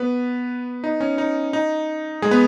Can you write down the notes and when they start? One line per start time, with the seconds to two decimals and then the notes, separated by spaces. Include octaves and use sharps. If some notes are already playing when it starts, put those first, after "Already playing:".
Already playing: B3 B4
0.84 D#4
1.00 C#4
1.18 D#4
1.53 D#4
2.22 G#3 G#4
2.31 B3 B4